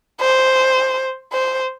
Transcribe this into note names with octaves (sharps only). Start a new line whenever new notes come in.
C5
C5